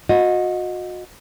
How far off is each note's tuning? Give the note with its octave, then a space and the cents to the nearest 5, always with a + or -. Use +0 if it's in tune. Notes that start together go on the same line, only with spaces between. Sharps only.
F#4 -30 D#5 +0